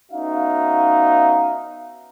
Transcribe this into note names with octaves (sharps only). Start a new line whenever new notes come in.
B3 C#4 D#4 F#4 E5 F5